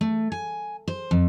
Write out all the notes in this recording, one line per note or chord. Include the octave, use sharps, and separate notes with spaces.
A3
G#5
C5
F2